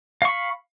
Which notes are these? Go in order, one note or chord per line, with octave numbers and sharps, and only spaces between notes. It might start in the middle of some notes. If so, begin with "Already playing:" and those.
F5 B5 C#6